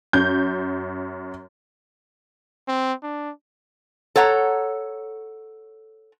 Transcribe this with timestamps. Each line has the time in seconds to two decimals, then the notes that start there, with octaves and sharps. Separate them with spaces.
0.13 F#2 G6
2.68 C4
3.03 D4
4.16 A4 C#5 F#5 A#5